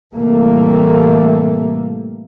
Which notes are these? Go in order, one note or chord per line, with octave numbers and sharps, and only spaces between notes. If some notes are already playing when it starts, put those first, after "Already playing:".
A2 C3 E3 G3 A3 A#3